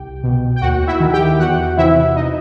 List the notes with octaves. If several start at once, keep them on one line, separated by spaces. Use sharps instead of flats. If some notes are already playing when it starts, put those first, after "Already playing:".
Already playing: C2 G4 G5
B2
G5
D#2 F#4 F#5
E4 E5
D#3
G4 G5
E2 F#4 F#5
C3 E3 E4 E5
D#4 D#5